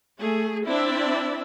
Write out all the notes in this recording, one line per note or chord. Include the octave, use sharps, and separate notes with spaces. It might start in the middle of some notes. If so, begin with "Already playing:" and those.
A3 G#4
C4 D4 E4 D5 E5